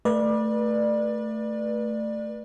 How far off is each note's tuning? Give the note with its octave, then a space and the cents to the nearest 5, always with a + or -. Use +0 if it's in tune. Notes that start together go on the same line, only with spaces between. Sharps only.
A3 +10 B4 -30 D5 +20